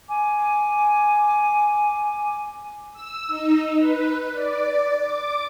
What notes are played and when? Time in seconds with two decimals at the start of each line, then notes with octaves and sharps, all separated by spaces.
0.08 G#5 D6
2.93 E6
3.27 D#4
3.77 B4
4.32 D5
5.01 D6